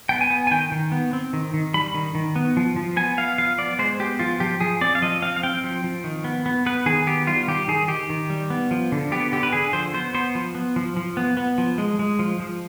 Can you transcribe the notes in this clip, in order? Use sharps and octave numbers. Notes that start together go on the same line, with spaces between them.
B3 G5
G#5
B3
G#5
D#3 G5
D#3
B3
C4
D#3
D#3
G3 B5
D#3
D#3
B3
F3
F3
B3 G#5
B3 F5
F3 F5
B3 D5
G#3 C5
B3 G4
F3 F4
F3 G4
F3 G#4
C4 D5
F5
F3 D#5
C4 F5
F5
C4 G5
F3
F3
D#3
B3
B3
B3 B4
D#3 G#4
B3 G4
G3 F4
D#3 G4
D#3 G#4
D#3 G4
D#3
G3
B3
F3
D3
B3 G4
D3 G4
B4
D3 G#4
F3 C5
B3 C5
B3 C5
F3
B3
F3
F3
B3
B3
F3
G#3
G#3
F3
F3